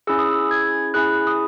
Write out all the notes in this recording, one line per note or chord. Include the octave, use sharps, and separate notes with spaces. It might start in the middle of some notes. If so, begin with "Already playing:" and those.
C#4 E4 G#4 E6
D#6
E6
G#6
C#4 E4 G#4 F#6
D#6